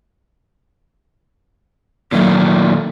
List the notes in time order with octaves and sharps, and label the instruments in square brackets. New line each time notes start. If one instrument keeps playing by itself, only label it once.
[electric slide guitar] A#2 D#3 A3 [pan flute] F#3